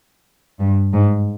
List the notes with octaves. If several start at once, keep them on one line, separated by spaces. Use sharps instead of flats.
G2
G#2